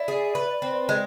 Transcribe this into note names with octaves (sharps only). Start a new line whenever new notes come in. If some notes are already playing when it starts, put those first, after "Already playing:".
Already playing: E4 D5
G#4
B4
C4
G#3